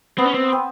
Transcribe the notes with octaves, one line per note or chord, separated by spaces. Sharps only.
B3 C4
C#4
C4
C4